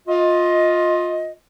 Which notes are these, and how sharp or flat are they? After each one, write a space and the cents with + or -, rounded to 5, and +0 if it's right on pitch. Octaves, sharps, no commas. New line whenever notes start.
F4 +20 D#5 +15